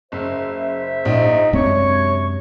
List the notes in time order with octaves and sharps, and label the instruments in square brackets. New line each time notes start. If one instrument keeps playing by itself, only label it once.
[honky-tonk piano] F#1 [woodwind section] C5 E5
[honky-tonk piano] A#1 [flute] D#4
[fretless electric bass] F#2 G#3 C4 [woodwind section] C3 F#4 C#6 [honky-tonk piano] D4 [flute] C#5